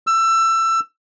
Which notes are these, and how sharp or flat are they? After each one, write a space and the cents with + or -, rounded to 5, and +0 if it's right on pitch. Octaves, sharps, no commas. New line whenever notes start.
E6 +20